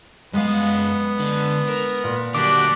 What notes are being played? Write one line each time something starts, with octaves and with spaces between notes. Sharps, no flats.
F#2 G#3 B3 F5 D#6
D3
A#4 E7
A#2
D3 F#3 D4 F#4 G4 D6